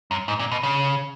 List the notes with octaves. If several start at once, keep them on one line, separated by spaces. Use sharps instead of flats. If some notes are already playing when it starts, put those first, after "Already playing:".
F#2
G#2
A#2
B2
C#3